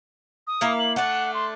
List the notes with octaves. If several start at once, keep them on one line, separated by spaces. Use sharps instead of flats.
D#6
A#3 E4 F5
F#7
A3 D4 F#5
C6